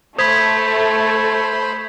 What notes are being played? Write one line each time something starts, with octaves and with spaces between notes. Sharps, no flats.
A3 C5 B5 D#6 G#6 B6